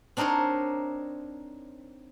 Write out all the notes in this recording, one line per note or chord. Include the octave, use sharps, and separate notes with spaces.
C4 D4 D#4 A#4 C5 C#5